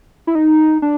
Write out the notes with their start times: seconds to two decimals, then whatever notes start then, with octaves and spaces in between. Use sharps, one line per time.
0.27 E4
0.35 D#4
0.82 D4